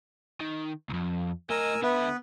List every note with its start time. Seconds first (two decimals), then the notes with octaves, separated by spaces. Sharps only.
0.41 D#3
0.89 C2 F2
1.50 A2 A#4 D#5 G#5 E6
1.83 D3 B3 B4 E5